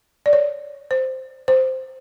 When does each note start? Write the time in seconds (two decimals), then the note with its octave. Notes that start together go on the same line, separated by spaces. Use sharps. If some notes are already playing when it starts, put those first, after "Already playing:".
0.26 D5
0.33 C#5
0.91 C5
1.48 C5